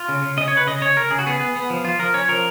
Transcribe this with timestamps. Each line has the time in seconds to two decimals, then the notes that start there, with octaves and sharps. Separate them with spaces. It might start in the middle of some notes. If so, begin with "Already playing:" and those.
Already playing: F4
0.09 C#3
0.22 C#3
0.37 C#3 D#5
0.48 C#5
0.52 C#3 B4
0.66 C#3 D#5
0.82 C#3 C#5
0.96 C#3 A#4
1.11 C#3 G#4
1.19 F#4
1.26 B3 G#4
1.40 B3
1.56 B3
1.70 F3
1.84 F3 F4
1.99 F3 A#4
2.14 C#4 C#5
2.28 F3 A#4